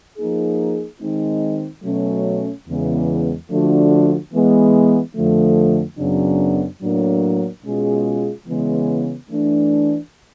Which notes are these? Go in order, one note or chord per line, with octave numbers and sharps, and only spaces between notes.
F3 A#3 D#4 G#4
D#3 G#3 C4 D#4
B2 F#3 A3 C#4
E2 C#3 E3 G#3 B3
D3 F3 A3 D4 F#4
E3 G#3 B3
F2 D3 F3 A3
F#2 C#3 F#3 B3 D4
A2 F#3 A#3 D4
B2 G#3 C#4 F4 G#4
C#3 E3 G#3 B3
E3 A3 D4